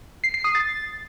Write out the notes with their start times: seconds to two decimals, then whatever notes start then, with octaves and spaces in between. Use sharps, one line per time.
0.24 C7
0.34 C7
0.44 D#6
0.55 A6